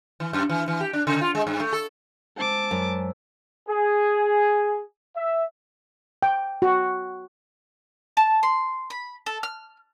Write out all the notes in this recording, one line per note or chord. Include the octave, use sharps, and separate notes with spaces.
E3
F#2
E3
E3
G4
D4
C#3
F4
G#3
G2
A3
A4
G#3 C5 A5 D6 E6
F#2
G#4
E5
G5
F#4
A5
C6
B5
A4
F6